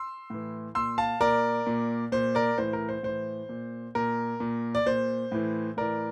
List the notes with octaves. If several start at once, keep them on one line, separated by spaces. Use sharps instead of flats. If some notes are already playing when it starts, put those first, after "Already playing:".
Already playing: C6 E6
A2 E3
A#2 C6 E6
F5 A5
A#2 A#4 D5
A#2
A#2 C5
A#4 D5
A2 E3 C5
A#4
C5
A2 E3 C5
A#2
A#2 A#4
A#2
D5
A#2 C5
A2 E3
A2 E3 A#4 D5